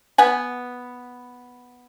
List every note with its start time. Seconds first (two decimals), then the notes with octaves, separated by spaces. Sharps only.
0.18 B3 F#5 G#5